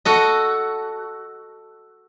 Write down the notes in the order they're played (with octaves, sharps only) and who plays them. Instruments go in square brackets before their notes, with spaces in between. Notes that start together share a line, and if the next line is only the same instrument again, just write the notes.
[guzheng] F#4 A4 D#5